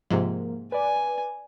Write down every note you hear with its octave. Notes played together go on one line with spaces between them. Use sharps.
G#2 C3 F3 A#3
B4 D5 G#5